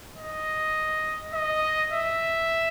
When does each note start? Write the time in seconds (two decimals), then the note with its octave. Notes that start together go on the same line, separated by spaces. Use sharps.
0.17 D#5
1.34 D#5
1.92 E5